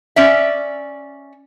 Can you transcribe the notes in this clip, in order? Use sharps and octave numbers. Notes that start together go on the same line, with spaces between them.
C#4 D5 E5